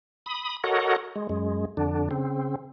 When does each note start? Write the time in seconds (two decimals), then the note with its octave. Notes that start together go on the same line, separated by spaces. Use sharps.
0.26 B5 D#6
0.64 F#4 A4 A#4 C#5 D#5 F#5
1.16 G#3
1.29 F#2 G#3
1.77 F2 D3 D4
2.11 C#3 C4